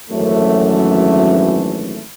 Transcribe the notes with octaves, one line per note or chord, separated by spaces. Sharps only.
G#1 F#2 E3 A3